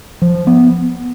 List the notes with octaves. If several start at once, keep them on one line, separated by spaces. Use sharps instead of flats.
F3
B3